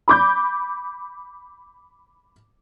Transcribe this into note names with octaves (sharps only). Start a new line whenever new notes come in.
B5 D6 G6